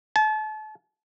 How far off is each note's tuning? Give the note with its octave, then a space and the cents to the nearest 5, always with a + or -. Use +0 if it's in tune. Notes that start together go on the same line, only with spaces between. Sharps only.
A5 -35